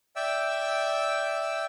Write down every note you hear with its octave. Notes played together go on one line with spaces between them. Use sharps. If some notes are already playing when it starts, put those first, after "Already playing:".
D5 E5 G5 E6